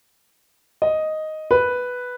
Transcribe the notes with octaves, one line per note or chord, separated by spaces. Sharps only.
D#5
B4